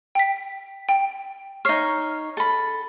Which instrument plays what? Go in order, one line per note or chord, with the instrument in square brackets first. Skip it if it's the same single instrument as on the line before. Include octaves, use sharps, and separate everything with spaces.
[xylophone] G5 B6
G5
[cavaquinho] D#4 C#5 [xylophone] F6 C7
[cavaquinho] A4 B5